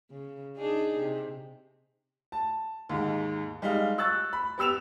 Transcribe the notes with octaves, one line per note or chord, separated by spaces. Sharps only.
C#3
D4 D#4 G#4
C3
A5
D#2 G#2
G3 G#3 D#4 D#5 F5
C#6 E6 F#6 A6
B5
B3 G4 E6 E7 F7